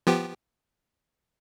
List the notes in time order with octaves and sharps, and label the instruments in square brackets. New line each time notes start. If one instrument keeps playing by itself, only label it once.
[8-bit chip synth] F3 B3 G4